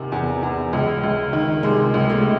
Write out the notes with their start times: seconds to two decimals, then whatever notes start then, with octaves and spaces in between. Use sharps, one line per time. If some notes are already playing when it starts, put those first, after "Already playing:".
Already playing: E2 C3 D#3
0.12 E2
0.43 E2
0.73 C#2
1.03 C#2
1.33 D#3
1.63 C3 G#3
1.94 C#2
2.10 A3